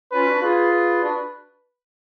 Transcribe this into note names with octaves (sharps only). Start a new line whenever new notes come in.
C#4 F4 B4
D4 F#4
F4 G#4 B4
B4
D4 F#4